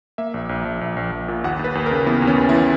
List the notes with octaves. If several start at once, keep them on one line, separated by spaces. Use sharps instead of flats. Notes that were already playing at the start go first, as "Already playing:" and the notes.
A#3 E5
A#1
A#1
A#1
A#1
A#1
A#1
A#2
D#2 F#5
D#2
B4
D#2
C#3 A#4
E3 B3
D#2
C#4
D#2
E4
E3